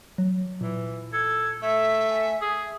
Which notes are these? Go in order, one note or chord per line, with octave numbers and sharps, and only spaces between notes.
F#3
A#2 E3
A4 G#6
A3 E5
G#5
G#4